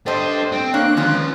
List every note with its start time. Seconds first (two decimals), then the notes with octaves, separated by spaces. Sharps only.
0.06 D4 G4 A4 C5 D#5
0.52 C4 G5
0.74 A#3 D4 C#5 F#6
0.97 D#3 F3 G#3 C#4 C6